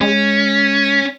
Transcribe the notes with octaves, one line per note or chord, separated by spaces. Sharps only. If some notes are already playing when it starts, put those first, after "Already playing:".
G#3 C#4